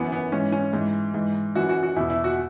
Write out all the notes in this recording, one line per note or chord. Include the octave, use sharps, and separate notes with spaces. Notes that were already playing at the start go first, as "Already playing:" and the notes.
Already playing: F#2 E3 B3
B3
G#2 E3 C#4
C#4
G#2 E3
G#2 E3
F#2 E3 F#4
F#4
F#4
E2 B2 E4
E4
F#4